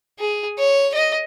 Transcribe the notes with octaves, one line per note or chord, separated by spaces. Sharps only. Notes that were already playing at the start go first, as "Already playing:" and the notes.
G#4
C#5
D#5